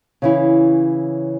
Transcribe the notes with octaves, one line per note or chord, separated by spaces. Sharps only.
C#3 E3 E4